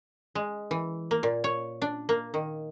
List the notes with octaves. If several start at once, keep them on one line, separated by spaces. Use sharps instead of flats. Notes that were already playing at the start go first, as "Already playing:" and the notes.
G#3
E3
A#3
A#2
C#5
D4
A#3
D#3